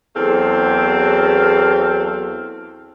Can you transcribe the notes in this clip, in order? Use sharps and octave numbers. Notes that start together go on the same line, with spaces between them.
E2 F#3 C4 A4 F5